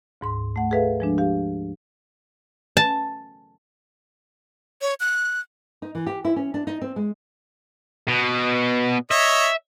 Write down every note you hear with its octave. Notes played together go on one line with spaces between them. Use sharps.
D2 G#2 C6
A3 F#5
G#4 A4 B4 E5 F5
F3 G#3 D4
G4 F5
A5
C#5
F#6
D#4
E3
G4
E4
C#4
D4
D#4
C4
G#3
B2
C#5 D#5 E5